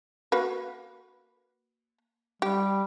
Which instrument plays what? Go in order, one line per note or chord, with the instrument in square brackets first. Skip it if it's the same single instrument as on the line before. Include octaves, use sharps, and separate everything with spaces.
[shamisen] A#3 F#4 B4
[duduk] G3 [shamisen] G4